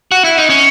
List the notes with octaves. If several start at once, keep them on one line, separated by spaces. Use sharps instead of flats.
F#4
E4
D#4
C#4